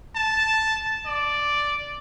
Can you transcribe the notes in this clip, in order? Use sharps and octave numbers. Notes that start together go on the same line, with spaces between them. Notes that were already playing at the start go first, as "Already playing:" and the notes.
A5
D5